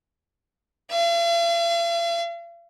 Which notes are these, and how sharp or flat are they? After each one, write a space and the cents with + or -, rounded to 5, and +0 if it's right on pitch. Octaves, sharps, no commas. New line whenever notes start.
F5 -45